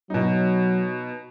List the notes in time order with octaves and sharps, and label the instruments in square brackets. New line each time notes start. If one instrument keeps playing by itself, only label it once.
[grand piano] B2 D#4 [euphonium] F#3